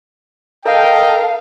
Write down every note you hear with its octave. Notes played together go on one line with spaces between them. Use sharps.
A4 A#4 D#5 F5 G5